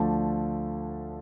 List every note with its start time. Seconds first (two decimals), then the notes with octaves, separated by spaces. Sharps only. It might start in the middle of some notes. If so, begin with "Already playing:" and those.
Already playing: D2 D3 F3 A3 D4 D5